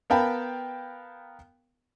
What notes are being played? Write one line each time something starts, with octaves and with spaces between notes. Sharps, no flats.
B3 A#4 F5 G5 A5 B5